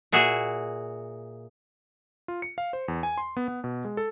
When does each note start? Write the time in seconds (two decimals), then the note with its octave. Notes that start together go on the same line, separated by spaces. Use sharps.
0.12 A#2 F#4 G#4 E5
2.28 F4
2.42 C#7
2.58 F5
2.73 C5
2.88 E2
3.03 G#5
3.18 C6
3.37 B3
3.48 B3
3.64 B2
3.85 G#3
3.97 A4